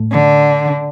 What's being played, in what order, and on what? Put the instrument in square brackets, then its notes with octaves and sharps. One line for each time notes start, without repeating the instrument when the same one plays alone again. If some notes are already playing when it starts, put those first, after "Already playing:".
Already playing: [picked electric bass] A2
[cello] D3